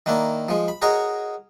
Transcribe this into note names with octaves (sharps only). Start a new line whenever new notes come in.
D#3 A#3 D4 E4
F3 G#3
B5
F#4 G#4 A#4 C#5 D#5